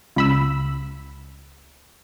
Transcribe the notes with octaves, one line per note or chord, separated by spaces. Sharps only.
C#2 B5 E6